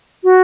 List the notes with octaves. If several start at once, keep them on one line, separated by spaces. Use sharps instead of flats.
F#4